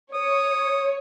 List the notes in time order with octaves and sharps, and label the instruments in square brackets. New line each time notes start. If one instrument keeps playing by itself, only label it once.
[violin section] C#5 [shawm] D#6